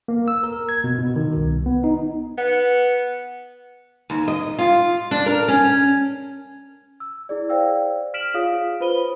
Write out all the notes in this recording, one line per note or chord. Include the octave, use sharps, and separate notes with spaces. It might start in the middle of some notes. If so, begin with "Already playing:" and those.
A#3
E6
A#4
G#6
B2
B2
D#3
C2
B3
D#4
B3
D#2
D#5
F4
D4
A#4
C#4
E6
E4 G#4 D5
G#4 C5 D5 F5 G5 E6
F6 B6 D7 E7 F#7
F4 G#4 C#5 F5 D#6
F4 B4 C5 B5 D#7 G7